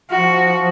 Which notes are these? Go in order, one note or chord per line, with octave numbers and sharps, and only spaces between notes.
F3 F#4